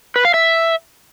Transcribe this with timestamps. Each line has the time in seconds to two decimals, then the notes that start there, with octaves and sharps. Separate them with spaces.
0.16 B4
0.25 F5
0.34 E5